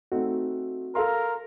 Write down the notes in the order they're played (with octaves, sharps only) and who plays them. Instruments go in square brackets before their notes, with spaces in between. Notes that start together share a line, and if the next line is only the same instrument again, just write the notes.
[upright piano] A3 C4 D#4 [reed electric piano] F#4
[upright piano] A4 F5 C6 [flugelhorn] A#4